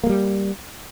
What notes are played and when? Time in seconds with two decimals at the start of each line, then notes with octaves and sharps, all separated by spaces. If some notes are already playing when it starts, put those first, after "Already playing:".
0.04 A#3
0.06 G#3
0.09 G3